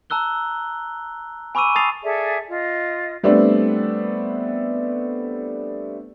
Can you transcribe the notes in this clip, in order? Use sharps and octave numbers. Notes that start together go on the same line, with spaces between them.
A5 A#5 E6 F#6 G7
G#5 B5 C#6 D6 E6 D#7
A5 D#6 A6 C7 F7
G#4 A4 D5 E5
F4 D#5
G3 A3 B3 C4 D4